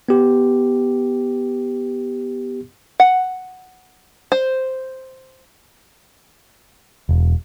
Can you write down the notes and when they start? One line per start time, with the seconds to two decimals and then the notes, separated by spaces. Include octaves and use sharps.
0.09 B3 G4
3.00 F#5
4.32 C5
7.09 E1